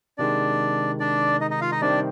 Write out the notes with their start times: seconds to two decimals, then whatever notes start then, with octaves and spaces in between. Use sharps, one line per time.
0.18 C3 D#3 G#3 D4 D5
1.00 D4 D5
1.41 D#4 D#5
1.51 D#4 D#5
1.61 F4 F5
1.72 D#4 D#5
1.82 C3 D#3 G3 C4 D4 G4 D5